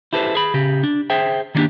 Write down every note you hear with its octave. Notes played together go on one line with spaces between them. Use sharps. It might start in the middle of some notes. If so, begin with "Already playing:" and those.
E4 G4 A4 B4 C5
G#4 B5
C#3 G4
D4
G#4 C5 E5 G5
D#3 G3 A#3 C#4 D4 G4